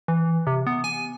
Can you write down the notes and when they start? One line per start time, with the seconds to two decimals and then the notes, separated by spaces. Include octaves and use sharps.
0.08 E3
0.47 C3
0.67 B3
0.84 G#5